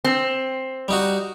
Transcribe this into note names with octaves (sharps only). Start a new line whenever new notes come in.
C4
G3 D#4 F#4